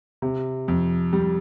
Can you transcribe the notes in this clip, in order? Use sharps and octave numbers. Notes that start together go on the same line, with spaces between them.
C3
F2
G3